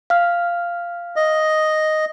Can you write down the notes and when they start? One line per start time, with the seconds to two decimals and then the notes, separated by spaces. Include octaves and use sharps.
0.10 F5 F6
1.16 D#5